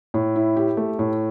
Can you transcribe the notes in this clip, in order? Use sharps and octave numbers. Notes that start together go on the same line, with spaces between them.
A2
E4
G4
A3
A2